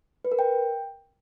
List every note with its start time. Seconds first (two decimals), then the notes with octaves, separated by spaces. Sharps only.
0.25 B4
0.32 A#4
0.39 G5